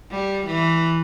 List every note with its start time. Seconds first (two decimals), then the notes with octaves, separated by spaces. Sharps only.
0.11 G3
0.47 E3